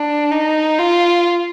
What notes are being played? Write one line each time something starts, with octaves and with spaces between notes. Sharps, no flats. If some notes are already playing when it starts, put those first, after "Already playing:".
Already playing: D4
D#4
F4